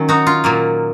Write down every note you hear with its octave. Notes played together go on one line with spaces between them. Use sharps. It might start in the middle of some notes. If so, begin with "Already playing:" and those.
Already playing: D#3 F#3 C#4
D#4 F#4
F4
A#2 F#3 A#3